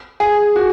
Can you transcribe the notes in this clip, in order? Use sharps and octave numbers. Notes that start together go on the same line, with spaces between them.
G#4
F#4